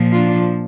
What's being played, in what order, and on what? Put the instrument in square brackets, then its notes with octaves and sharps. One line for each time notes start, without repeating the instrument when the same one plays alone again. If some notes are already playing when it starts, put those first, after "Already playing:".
Already playing: [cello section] A#2 F3
D4 F4